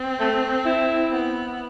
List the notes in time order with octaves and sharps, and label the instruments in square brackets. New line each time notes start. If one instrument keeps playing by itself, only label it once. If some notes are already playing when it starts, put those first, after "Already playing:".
Already playing: [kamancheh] C4
[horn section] A3
E4
[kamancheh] B3